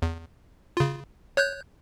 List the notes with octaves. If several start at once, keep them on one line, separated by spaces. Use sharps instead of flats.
E2
C#3 F4
C#5 F#6 G6